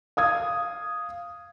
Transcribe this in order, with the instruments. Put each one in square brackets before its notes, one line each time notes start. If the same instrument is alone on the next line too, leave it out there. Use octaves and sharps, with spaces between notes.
[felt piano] F5 D#6 G#6